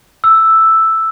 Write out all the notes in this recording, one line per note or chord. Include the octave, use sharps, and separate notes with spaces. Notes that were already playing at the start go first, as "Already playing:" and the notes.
E6